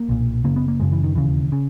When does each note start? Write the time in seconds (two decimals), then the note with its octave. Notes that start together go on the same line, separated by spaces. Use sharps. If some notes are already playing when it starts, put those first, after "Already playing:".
Already playing: A#3
0.09 B1 A#2
0.44 F#1 F#2 C#3 A#3
0.56 B3
0.68 A#3
0.80 F#1 F#2 C#3 G#3
0.92 E3
1.03 D#3
1.15 E1 D#2 C#3 E3
1.52 C#3